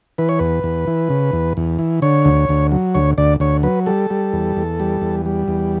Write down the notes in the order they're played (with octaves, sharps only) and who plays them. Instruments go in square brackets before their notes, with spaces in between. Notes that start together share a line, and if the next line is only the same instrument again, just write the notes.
[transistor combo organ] E3 B4
C#5
E2 B4
E2
E3
C#3
E2
E2
E3
D3 C#5
D2
D2
F#3
D2 C#5
D2 D5
D2 C#5
F#3 B4
G3 A4
G3
E2
E2
G3
E2
G3
E2